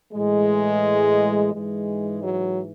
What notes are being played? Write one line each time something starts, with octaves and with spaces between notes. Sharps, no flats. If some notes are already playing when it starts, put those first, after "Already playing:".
A2 E3 G#3
G#2 E3 G#3
F#3